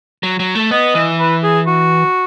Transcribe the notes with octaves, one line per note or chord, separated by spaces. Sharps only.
F#3
F#3
A3
B3 D#5
E3
B4
G#4
F#4